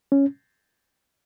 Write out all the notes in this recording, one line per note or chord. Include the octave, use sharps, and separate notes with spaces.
C#4